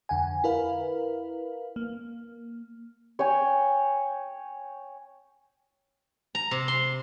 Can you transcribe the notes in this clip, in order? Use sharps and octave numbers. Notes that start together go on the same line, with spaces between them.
F2 D3 F#5 G#5
E4 A#4 B4 F5
A#3
C#5 G5 G#5
A#5
C3
C6